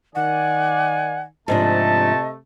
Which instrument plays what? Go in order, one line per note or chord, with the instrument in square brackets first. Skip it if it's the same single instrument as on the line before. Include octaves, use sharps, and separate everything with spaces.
[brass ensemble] D#3 D5 G#5 [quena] F#5
[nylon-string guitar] G#2 F3 D4 [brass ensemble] C3 A3 [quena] D#5 [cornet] A5